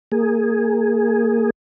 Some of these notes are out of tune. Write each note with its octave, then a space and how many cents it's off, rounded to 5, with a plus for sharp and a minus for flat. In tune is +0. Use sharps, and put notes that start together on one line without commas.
A#3 -20 G#4 +0